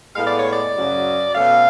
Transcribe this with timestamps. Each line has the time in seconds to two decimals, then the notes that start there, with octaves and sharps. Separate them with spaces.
0.16 A2 G#3 B3 F5
0.27 D5
0.39 C#5
0.51 D5
0.74 F#2 C#3 F#3
1.34 B2 A3 C#4 F5